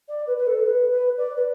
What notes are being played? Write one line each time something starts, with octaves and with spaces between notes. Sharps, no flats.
D5
B4
B4
A4
B4
B4
D5
B4